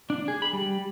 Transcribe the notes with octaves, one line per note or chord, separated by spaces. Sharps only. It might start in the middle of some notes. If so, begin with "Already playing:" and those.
D4
G#4
B5
G3